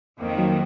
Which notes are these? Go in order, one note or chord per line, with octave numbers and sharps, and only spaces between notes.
F2 D#3 A#3
F#3